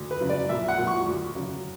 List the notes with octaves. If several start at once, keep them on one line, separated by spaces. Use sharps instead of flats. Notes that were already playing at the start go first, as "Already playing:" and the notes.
Already playing: D2
B4
C#3 F#3
D5
A#1 E5
F#5
A#2 F#3
C#6
D2
C#3 F#3